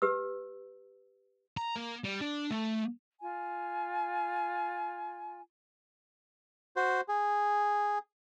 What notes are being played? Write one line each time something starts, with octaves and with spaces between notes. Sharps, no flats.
G4 B4 E6
A#5
A#3
G3
D4
A3
F4 G#5
F#4 C5
G#4